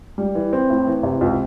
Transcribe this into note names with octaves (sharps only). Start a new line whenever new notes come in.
G3
E3
C4
A2
E3
C3
C#2